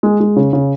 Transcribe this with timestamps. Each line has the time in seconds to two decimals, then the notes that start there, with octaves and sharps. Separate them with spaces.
0.03 G#3
0.20 G#3
0.36 C#3
0.53 C#3